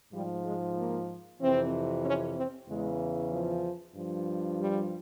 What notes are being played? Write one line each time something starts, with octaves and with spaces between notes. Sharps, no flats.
G#2 F3 G3
G#3
A#3
F2 C3 E3 C4
C#4
C4
E2 C#3 E3 G#3
F3
G2 F3
G3